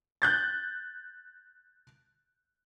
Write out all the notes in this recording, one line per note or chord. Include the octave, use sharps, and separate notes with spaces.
F#6 G6 A6